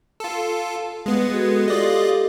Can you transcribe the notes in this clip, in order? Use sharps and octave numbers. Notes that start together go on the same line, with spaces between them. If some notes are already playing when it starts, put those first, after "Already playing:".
F4 A4
G#3 B3
F#4 G#4 A4
F4 G4 A4 D5 D#5